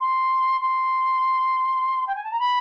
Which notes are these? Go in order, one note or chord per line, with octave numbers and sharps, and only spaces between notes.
C6
C6
G5
G#5
A5
A#5
B5